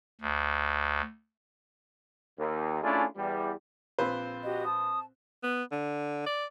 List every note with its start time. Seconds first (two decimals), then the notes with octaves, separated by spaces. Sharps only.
0.21 D2
2.38 D#2
2.82 A3 C#4 D4 E4 F4 G#4
3.16 E2 G3
3.99 A#1 C4 F4 B4 C5
4.44 F#4 G4 D#5
4.65 A5 D#6
5.43 B3
5.72 D3
6.26 D5